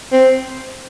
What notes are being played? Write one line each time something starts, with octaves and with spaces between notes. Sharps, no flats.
C4